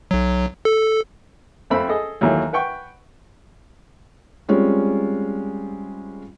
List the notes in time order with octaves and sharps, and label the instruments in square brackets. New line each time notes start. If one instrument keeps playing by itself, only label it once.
[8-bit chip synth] B1 F#3
A4
[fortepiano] F2 A3 C4 E5 B5
G#4 A4 D#5
D#2 E3 F#3 A3
B4 F#5 G5 C#6
[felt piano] G3 G#3 C4 C#4 F4